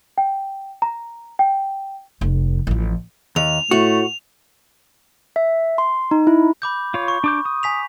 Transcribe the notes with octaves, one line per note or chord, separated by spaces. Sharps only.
G5
A#5
G5
F1 F2
A1 F3
D#2 F7
A2 A3 F#4
E5
C6
D#4
E4
B5 D6 G6
F4 C#5
C#6
D4 D6 G6
D#6
G#5 B6 F7